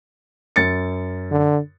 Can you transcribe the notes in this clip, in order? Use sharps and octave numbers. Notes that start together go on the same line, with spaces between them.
F#2 A6 C#7
D3